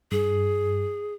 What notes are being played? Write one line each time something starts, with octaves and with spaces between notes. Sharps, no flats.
G2 G#4